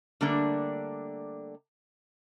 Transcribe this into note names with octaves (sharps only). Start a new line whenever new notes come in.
D3 G3 A3 A#3 D4